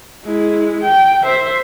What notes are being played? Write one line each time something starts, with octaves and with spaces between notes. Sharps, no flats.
G#3 E4
G5
C5 E5